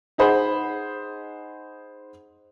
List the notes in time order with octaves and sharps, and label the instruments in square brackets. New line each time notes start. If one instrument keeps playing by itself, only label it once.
[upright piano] D#4 G#4 C5 F#5 B5